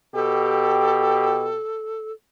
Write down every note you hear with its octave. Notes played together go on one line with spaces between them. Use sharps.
B2 G4 A4